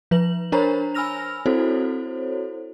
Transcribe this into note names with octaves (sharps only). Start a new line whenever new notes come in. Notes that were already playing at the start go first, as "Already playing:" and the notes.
F3 B4 F#7
D4 A#4 C5 C#5 A#5 B5
G#5 B5 E6 F6 A#6 F7
C4 E4 F#4 A4 C5 C#5